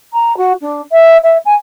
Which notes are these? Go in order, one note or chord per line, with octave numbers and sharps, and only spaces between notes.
A#5
F#4
D4
E5
E5
G#5